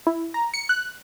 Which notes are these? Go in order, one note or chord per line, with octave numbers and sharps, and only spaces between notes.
E4
A#5
C#7
F#6